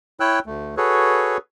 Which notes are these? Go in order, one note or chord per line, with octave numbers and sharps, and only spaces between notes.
E4 C#5 G5 E6 F#6
D2 A3
F#4 G#4 A4 B4 C#5